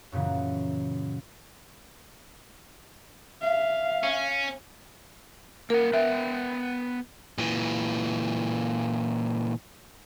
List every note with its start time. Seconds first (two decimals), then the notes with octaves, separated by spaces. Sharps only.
0.12 F#2 A#2 C#3 E3
3.42 E5 F5
4.04 C#4
5.70 A#3 A#4 F#5
5.93 B3 B4 E5 G5
7.38 A#2 E3